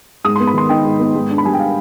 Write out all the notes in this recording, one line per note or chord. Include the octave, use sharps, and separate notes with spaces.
G#2 D#6
B3 C6
B5
D#3 C6
D#4 G5
G#2
B3
G#2
D4
B5
G3 G#5
G5
F5